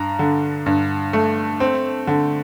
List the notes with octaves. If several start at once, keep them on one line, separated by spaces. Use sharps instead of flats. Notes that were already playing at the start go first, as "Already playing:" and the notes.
Already playing: G2 A#5
D3
G2
A3
C4
D3